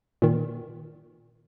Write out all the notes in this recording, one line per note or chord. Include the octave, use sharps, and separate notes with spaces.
A#2 D#3